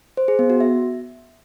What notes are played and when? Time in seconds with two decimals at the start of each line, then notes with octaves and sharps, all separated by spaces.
0.17 C5
0.28 G#4
0.39 B3
0.50 F#4
0.60 E5